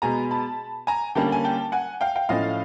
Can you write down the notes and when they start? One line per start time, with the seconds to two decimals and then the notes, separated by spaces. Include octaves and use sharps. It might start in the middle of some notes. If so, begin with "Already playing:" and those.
0.02 B2 G#3 B3 G#5 A#5
0.31 A5 B5
0.87 G#5 A#5
1.15 D3 G3 A#3 C#4 G5 A5
1.32 G#5
1.44 G5 A5
1.72 F#5 G#5
2.01 F5 G5
2.16 F5 G5
2.29 A2 F3 A3 C#4 D#5 F5